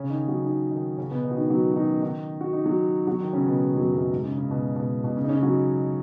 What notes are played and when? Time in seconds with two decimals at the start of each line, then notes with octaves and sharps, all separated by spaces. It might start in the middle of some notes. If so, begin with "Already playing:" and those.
Already playing: C#3 C#4
0.10 D#3 D#4
0.28 F#3 F#4
0.45 D#3 D#4
0.71 D#3 D#4
0.98 C#3 C#4
1.11 B2 B3
1.24 D#3 D#4
1.31 F#4
1.37 D#3 D#4
1.50 F#3 F#4
1.72 F#4
1.76 D#3 D#4
2.02 D#3 D#4
2.41 F#4
2.53 D#4
2.65 F#3 F#4
3.07 F#3 F#4
3.20 D#3 D#4
3.33 C#3 C#4
3.46 B2 B3
3.59 C#3
3.77 F#2 F#3
3.94 F#2 F#3
4.12 G#2 G#3
4.25 C#3
4.38 C#3
4.51 B2
4.76 B2
5.04 B2
5.16 C#3
5.24 D#4
5.29 C#3 C#4
5.37 D#4
5.42 F#3 F#4